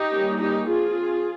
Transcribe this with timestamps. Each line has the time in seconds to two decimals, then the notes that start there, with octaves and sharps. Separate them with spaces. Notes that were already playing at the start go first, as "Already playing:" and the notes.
Already playing: D#4 G4
0.10 G3 A#3 C#4
0.39 D#4 G4
0.67 F3 C4 F4 G#4